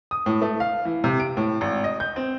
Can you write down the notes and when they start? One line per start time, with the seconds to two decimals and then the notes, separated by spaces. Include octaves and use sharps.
0.11 D#6
0.26 A2
0.42 A3
0.60 F5
0.85 E3
1.04 C3
1.20 D7
1.37 A2
1.61 G#1
1.84 D#5
2.00 G6
2.16 C4